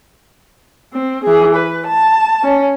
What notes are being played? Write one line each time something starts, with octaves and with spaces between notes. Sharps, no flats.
C4
E3 G#4
B4
A5
C#4